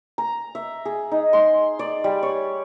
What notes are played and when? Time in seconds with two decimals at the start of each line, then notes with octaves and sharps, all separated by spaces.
0.18 A#5
0.55 E5
0.85 G#4
1.11 D#4
1.33 C6
1.79 D5
2.04 G3
2.23 C#5